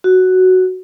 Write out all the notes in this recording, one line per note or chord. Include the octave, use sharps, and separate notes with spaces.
F#4